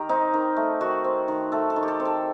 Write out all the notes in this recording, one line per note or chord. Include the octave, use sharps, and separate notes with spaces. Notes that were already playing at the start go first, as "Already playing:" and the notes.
Already playing: D#3 G4 A#4
C4 D#4
D#3
A3
D#3 F#4
C4
D#3
A3 A4
A4
D#3
G4
A4
C4
A4